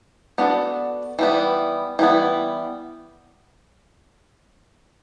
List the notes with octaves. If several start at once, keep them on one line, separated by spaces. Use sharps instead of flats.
B3 D4 F#4 A4
E3 G3 B3
E3 G3 B3